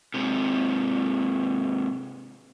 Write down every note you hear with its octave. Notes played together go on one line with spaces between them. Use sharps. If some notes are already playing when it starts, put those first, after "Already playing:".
G#2 C3